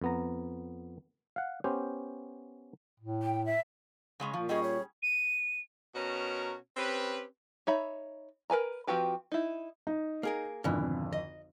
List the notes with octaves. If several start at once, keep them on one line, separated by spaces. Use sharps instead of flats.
F2 B3 A#5
F5 F#5
B3 C#4 G4 C5
A2
G5
E5
C#3 G#3 C#4
A#2 F3
G3 C#4 G#4 D#5
C#5
D#7
B2 C#4 F#4 A#4 A#5
C4 C#4 G4 B4
D#4 C#5 E5 B5
A#4 B4 G#5 A#5
F3 C4 F#4 G4 B4
D#4 E4
D#4
A#3 G#4 A#4
G#1 F2 B2 D3 E3
D#5